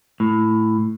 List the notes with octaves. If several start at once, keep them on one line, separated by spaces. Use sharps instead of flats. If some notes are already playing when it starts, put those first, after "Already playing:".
A2